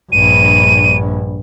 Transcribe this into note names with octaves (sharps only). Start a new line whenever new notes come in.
A#1 G2 D#7